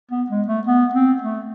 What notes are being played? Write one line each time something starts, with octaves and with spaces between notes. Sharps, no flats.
B3
G#3
A3
B3
C4
A3